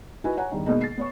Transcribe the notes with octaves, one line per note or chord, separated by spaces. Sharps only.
D#4 E4 F#4 B4 G#5
C#5 F#5 G#5 A#5
E2 G2 D#3
B2 G#3 A#3 B3 D#4
A6 C7
B3 C#5 C#6